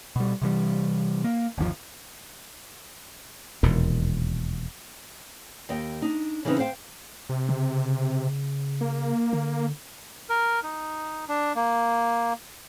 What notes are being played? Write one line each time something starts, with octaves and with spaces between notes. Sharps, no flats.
B2 G3
C3 E3 G3
A#3
G1 D#2 C#3 F3
E1 D#2 A#2
D#2 D#5 G5
D4 D#4
C#3 E3 C4 C#4 D#4 B4
C5 F5 G5
C3
C#3
A#3
D3
A#4
D#4
D4
A#3